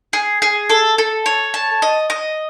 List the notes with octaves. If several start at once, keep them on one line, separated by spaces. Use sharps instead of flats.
G#4
G#4
A4
A4
C#5
A5
D#5
D#5